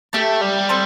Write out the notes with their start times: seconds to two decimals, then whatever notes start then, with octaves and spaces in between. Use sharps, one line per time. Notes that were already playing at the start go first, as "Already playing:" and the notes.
0.13 A3 G4 E5 A5
0.41 G3
0.69 C4 A4 C5